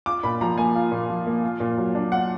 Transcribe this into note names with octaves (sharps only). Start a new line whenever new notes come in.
F4 D6
A#2 B5
F3 A#5
A#3 G#5
F4
A#2
F3
A#3
F4
A#2
F#3
D4
F4 F#5